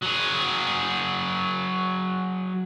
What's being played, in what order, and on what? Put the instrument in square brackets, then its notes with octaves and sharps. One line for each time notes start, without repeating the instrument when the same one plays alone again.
[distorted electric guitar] F#3 G#4